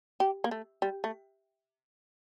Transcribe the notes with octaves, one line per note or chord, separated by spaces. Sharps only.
G4
A#3
A3
G3
A3